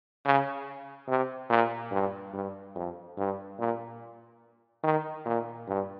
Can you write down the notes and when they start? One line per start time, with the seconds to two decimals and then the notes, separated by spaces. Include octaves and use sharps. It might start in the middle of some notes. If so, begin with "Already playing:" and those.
0.25 C#3
1.08 C3
1.50 A#2
1.92 G2
2.34 G2
2.75 F2
3.17 G2
3.59 A#2
4.83 D#3
5.25 A#2
5.67 G2